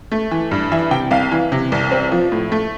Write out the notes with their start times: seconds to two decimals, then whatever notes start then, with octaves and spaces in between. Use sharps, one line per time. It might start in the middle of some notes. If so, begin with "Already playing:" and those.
0.12 A3
0.31 E3
0.51 G2
0.72 E3 E5
0.91 C3 G5
1.11 C2 F5
1.32 E3
1.52 C3
1.72 C2
1.92 C4
2.12 F3
2.32 A2
2.52 A3